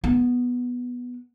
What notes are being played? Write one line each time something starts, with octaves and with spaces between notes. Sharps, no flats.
B3